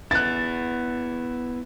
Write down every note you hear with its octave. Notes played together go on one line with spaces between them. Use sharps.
B3 E4 F#6 A6